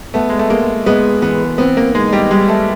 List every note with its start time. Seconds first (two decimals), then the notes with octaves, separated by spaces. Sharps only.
0.14 A3 B3
0.29 G#3
0.39 A3
0.50 G#3 A#3
0.86 G#3 B3
1.22 E3 B3
1.58 B3 C4
1.77 A#3
1.95 G#3 D#4
2.13 G3
2.31 G3 G#3
2.48 A3